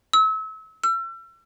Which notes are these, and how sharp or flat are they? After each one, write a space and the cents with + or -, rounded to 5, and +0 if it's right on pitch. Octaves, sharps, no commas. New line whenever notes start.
E6 -35
E6 +40